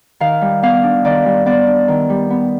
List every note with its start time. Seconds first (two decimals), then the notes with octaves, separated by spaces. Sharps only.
0.20 D#3 F5
0.41 G3
0.63 B3 F5
0.83 D4
1.04 D#3 D5
1.26 G3
1.46 B3 D5
1.67 D4
1.88 D#3
2.10 G3
2.30 B3